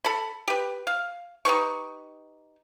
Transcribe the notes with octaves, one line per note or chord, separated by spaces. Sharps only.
A4 B5
G4 B4
F5
D#4 G4 B4 C#6